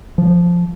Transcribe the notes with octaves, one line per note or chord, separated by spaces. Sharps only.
F3